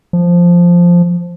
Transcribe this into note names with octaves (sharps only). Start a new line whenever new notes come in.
F3